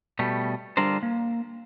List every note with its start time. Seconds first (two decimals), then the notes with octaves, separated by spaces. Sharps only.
0.19 B2 G3 A3
0.77 D3 G3 D4 F4 A#4 C5
1.03 A#3